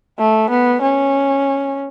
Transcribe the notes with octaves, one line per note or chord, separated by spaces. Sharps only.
A3
B3
C#4